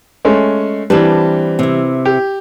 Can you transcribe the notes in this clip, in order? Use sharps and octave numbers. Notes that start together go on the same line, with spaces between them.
G#3 A3 C#4
E3 G3 C4 D4 B4
C3 E4
G4